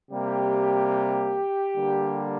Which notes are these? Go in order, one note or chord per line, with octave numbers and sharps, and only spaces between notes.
C3 G3 A#3 G4
D3 G3 A#3